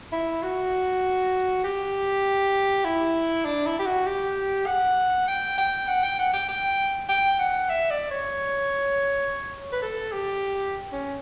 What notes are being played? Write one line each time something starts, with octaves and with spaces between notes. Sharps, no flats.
E4
F#4
G4
E4
D4
E4
G4
F#4
G4
F#5
G5
G5
F#5
G5
F#5
G5
G5
G5
F#5
E5
D5
C#5
B4
A4
G4
C#4